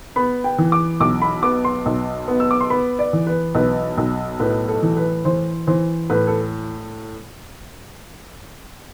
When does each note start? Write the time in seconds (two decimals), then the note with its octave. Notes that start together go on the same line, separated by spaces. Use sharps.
0.16 B3 B5
0.44 G5
0.58 E3
0.72 D6
1.00 B1 D6
1.22 B5
1.43 B3 D6
1.65 C6
1.86 B1
2.28 B3
2.40 E6
2.51 D6
2.61 C6
2.70 B3 B5
2.99 D5
3.13 E3
3.27 B4
3.55 B1 B4
3.98 B1
4.40 A2 B4
4.69 A4
4.83 E3
4.97 B4
5.25 E3 C5
5.67 E3 C5
6.10 A2 B4
6.27 A4